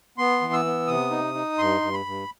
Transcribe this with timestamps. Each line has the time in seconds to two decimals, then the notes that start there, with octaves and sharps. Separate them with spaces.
0.18 B3 C6
0.41 E3
0.53 E6
0.65 B3
0.87 C3 D#6
1.11 D#4
1.34 D#4
1.58 G2 C6
1.81 G2
1.93 B5
2.06 G2